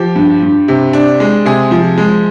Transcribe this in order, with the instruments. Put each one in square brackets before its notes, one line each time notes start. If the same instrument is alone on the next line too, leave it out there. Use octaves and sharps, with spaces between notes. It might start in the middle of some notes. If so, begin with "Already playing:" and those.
Already playing: [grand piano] F3 G4
G2
G2
C3
D4
G#3
C3 G#4
F3
G#3